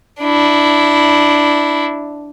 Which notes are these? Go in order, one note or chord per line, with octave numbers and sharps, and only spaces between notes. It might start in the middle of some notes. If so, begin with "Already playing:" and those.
D4 E4